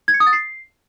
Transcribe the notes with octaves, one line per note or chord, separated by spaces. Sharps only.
G#6
C#7
D#6
A6
C7